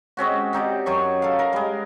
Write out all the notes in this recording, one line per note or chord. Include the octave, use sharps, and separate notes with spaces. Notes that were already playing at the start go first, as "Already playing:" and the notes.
G#3 C4 C#4 F#4
C4 D#4 G4 D5
F#2 F#3 C#6
A4 F5
A#4
G3 G#3